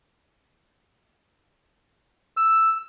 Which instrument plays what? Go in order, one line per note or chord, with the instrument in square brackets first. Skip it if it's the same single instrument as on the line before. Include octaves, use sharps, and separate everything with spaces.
[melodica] E6